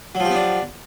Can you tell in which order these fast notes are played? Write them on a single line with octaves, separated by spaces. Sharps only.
F#3 F3 G4 B3 D4